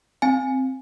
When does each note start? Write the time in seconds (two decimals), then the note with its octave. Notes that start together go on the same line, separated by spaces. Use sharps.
0.22 C4 G#5